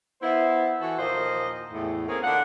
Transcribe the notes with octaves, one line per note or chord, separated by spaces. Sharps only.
B3 E4 C5
E3 F#4 A4
D#2 A#2 F3 A#3 C5 D#5
E2 A2
G#2 A#3 C4 C#4 G#4 A#4
D3 D4 F4 A4 F#5